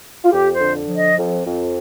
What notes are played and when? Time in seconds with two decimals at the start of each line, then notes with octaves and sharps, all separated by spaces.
0.24 F4
0.32 F2 G4
0.53 C5
0.60 D3
0.89 F3
0.96 D#5
1.17 F2
1.46 F2